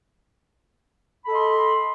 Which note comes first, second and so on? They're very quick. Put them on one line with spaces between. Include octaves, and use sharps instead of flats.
B5 A4 D#5 C6